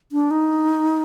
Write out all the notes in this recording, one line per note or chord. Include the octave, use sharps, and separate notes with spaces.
D4
D#4